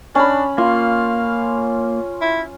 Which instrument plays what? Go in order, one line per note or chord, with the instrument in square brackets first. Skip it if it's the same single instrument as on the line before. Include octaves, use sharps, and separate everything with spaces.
[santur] C#4 B5 [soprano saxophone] D4
[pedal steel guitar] A#3 [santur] F4 [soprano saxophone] F5
[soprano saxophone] E4